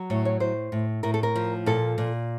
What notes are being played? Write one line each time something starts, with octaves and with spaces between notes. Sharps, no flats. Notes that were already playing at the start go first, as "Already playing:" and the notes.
Already playing: F#3
A2 C#5
C#5
A2 C5
A2
A2 A#4
A4
A#4
F3
A#2 A4
A#2